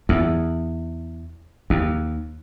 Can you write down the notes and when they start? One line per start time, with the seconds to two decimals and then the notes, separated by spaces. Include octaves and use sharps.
0.09 E2
1.70 D#2